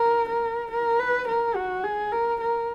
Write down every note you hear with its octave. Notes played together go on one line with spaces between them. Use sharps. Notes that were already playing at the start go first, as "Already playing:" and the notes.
Already playing: A#4
A#4
A#4
B4
A#4
F#4
G#4
A#4
A#4